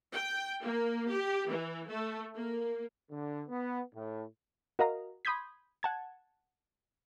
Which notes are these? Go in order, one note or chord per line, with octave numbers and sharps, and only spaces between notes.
G5
A#3
G4
E3
A3
A#3
D3
B3
A2
F#4 A#4 D#5 F5 A#5
B5 C6 D#6 G6 G#6 B6
F#5 A5 G#6